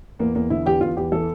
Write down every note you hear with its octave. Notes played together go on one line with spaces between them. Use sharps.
E2 A#3
E2 A#3
D3 E4
E2 G4
E2 F4
E2 G4
E3 A4